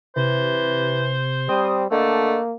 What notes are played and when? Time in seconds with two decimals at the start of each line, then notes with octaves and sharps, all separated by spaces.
0.16 C3 E3 C5
1.49 G3 C4 D#6
1.91 D3 A3 A#3 D#5